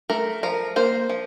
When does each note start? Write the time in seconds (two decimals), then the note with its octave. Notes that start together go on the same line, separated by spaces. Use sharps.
0.10 A3 A#4
0.43 F3 A#4
0.76 A#3 C5
1.09 F3